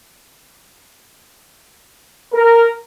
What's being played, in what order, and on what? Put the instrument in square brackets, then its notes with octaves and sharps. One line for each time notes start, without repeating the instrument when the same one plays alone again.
[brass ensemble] A#4